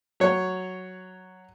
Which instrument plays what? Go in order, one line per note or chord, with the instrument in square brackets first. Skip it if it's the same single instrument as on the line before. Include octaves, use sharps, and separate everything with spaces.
[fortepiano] F#3 C#5